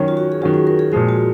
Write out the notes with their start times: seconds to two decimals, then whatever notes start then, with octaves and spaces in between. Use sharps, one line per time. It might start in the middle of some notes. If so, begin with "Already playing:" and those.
Already playing: D#3 F#3 C#4
0.08 F4
0.17 F#4
0.32 G#4
0.41 D#3 F#3 C#4 F#4
0.54 G#4
0.67 A#4
0.79 G#4
0.92 A#2 F3 G#3 F#4
1.09 F4